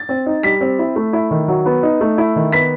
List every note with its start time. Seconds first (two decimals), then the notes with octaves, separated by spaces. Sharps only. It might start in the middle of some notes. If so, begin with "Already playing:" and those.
Already playing: A6
0.09 C4
0.26 D#4
0.43 G3 B6
0.61 C4
0.79 E4
0.96 A3
1.13 E4
1.31 D#3
1.48 F#3
1.66 B3
1.83 D#4
2.01 A3
2.18 E4
2.36 D#3
2.52 B3 B6